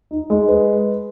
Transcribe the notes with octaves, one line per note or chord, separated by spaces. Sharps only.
D#4
G#3
B4